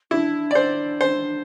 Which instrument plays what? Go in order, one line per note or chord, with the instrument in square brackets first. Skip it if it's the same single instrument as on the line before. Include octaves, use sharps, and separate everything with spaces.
[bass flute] D4 [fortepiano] E4
[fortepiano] D5
[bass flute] D4 [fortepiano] C5
[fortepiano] C5